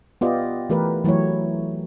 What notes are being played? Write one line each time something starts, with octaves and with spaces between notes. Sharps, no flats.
B3 F4 G4 D5 D#5
E3 A3 G4 A#4 B4
E3 F#3 A3 E4 C#5